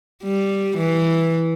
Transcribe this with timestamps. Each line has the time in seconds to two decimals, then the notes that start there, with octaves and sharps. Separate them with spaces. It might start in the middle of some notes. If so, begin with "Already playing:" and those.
0.23 G3
0.78 E3